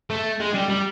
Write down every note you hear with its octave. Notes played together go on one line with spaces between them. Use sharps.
A3
G#3
G3
G3